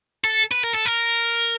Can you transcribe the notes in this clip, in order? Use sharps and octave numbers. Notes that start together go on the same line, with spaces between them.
A4
B4
A#4
A4
A#4